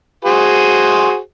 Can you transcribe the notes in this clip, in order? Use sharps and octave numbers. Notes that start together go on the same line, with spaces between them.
F#4 G#4 C5